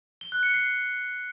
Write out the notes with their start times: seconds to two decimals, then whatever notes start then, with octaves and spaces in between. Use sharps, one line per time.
0.21 G7
0.32 F#6
0.43 C#7
0.54 C7